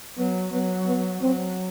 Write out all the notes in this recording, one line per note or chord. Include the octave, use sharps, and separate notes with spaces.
F#3 B3
F#3 B3
B3
F#3 C4